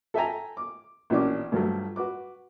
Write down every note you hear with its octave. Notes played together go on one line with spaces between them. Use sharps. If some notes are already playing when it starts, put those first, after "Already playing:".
A4 E5 G5 G#5 A#5
D6
A#1 B2 E3 C#4 D4 D6
G2 F3 F#3 A3
F#4 B4 D6